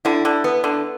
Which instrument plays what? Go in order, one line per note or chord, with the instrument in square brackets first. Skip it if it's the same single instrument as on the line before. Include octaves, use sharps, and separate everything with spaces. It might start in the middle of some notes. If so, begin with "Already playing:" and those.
[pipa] D3 [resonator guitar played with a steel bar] E4
[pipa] D3
[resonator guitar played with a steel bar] B3
[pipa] D3